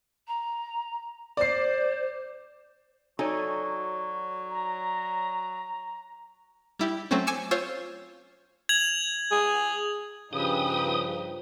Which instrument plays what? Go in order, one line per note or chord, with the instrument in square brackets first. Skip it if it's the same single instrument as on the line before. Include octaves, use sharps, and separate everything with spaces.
[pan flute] A#5
[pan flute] C5 [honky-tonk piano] D5 C7
[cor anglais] F#3 [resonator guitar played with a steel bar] D#4 A4 G#5 [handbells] F#4 C#5 D5
[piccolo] A#5
[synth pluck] G3 E4 G4
F#3 A3 C4 C#4
G#5 D6 E6 C#7 E7
F4 C5 C#5 E6
[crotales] G#6 F7 F#7
[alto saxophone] G#4
[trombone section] G2 F3 [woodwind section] C#3 [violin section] D#4 G4 B4 [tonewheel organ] D#6